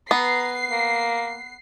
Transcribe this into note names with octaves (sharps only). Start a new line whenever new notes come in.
B3 A#5 C7
A#3